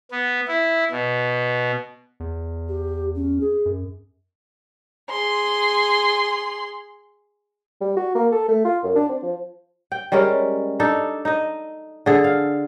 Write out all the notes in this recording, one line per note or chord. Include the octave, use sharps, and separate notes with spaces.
B3
E4
B2
E2
G4
C#4
G#4
F#2
G#4 C6
G3
F#4
A#3
A4
A3
F4
F#2
D4
C4
F3
G5
G3 G#3 C#4 A#4
D4 D#4 A4
D#4 D#5
D3 G#4 A4
F5